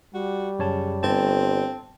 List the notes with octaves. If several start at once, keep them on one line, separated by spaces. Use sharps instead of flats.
G3 F#4
F#2 C#3 C#5 A5
G1 C4 A5